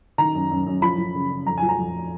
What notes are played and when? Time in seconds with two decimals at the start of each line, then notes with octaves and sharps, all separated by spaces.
0.18 D#3 A#5
0.34 F#2
0.51 F#2
0.67 F#2
0.82 F3 B5
0.98 F3
1.15 C#3
1.30 C#3
1.46 F2 A#5
1.58 G#5
1.63 F3
1.69 A#5
1.79 F2